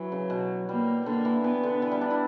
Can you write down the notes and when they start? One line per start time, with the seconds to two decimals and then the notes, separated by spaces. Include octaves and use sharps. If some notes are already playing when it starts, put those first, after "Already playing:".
Already playing: E3 F#3
0.12 C#3
0.30 B2
0.68 G3 A#3
1.06 D3 A#3
1.25 E3
1.44 E3 B3
1.63 D3
1.82 E3
1.91 G3
2.01 D4
2.10 E4